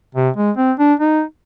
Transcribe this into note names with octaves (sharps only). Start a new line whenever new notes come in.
C3
G#3
C4
D4
D#4